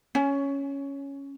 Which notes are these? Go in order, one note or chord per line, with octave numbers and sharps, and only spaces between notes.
C#4